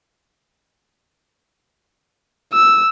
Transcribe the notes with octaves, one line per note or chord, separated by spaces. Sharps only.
E6